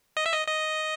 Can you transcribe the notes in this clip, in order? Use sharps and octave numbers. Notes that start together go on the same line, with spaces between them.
D#5
E5
D#5
D#5